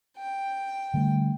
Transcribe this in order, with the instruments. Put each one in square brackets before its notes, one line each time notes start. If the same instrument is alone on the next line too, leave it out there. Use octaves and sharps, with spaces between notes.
[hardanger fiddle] G5
[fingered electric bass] D3 G3 A3